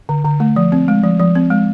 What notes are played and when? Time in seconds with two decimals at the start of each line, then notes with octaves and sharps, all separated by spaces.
0.09 D3
0.25 D3
0.40 A3
0.56 F3
0.72 C4
0.88 G#3
1.03 F3
1.19 F3
1.35 C4
1.50 G#3